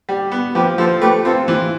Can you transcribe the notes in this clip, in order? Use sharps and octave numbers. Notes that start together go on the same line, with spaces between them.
G3
B3
F3 G4 B4
F3 A4 C5
A3 G4 B4
C4 F4 A4
E3 F4